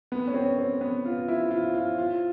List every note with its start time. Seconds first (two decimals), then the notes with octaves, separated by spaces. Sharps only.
0.12 B3
0.27 C#4
0.34 C4
0.59 C4
0.81 B3
1.05 F4
1.28 E4
1.51 F4
1.74 F4
1.98 F4